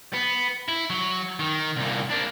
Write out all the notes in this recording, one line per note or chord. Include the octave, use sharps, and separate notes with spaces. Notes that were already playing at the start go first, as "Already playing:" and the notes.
B3
E4
F#3
D#3
C2 A#2
A#3 D4